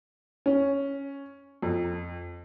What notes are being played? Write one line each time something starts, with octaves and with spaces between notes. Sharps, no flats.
C#4
F2